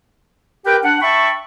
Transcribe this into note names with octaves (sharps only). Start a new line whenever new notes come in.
G4 A#4 B4 G5
D4 F#5
E5 G5 A5 B5 C#6